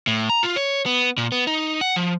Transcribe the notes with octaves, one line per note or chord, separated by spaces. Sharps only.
A2
A#5
F4
C#5
B3
A#2
B3
D#4
F#5
F3